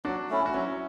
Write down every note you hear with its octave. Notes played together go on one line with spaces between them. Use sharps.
F#3 D4 F#4
A3 C#4 E4
F#4
F#3 C#4 E4